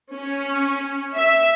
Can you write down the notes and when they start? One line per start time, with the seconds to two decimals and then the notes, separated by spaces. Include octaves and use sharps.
0.15 C#4
1.15 E5